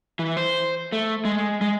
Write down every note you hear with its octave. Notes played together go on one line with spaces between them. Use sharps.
E3
C5
A3
G#3
G#3